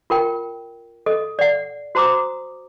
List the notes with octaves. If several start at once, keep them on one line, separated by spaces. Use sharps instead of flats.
F4 A#4 G5
A4 D#5
D5 F#5
F#4 C5 A#5 D6 D#6